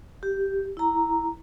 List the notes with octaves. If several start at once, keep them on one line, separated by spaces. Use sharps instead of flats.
G4
E4 A#5